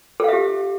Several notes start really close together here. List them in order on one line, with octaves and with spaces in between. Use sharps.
A4 F5 E5 G4